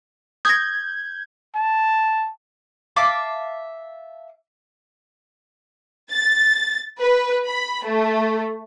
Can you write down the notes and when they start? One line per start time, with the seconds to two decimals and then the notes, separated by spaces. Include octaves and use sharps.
0.45 D#6 G6 G#6 A#6
1.55 A5
2.96 E5 F5 A5 D6
6.12 A6
7.01 B4
7.46 B5
7.86 A3